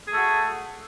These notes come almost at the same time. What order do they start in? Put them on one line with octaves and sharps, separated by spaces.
G#4 A3 F#4